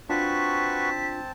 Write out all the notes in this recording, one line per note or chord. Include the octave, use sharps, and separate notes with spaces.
C4 D4 F4 F#4 B4 A5 C#6 B6